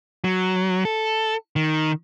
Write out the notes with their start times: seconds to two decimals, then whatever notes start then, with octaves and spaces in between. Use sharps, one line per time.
0.25 F#3
0.85 A4
1.56 D#3